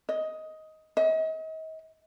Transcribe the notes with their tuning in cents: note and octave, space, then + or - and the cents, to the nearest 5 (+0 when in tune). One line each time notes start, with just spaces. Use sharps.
D#5 +10
D#5 +40